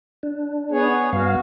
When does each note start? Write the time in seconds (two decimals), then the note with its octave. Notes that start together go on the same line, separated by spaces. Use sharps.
0.23 D4
0.71 B3 G#4 C#5
1.13 G2 B3 F#4 F5